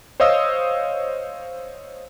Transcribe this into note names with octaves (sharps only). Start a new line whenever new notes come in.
C5 C#5 D#5 F5 D#6 E6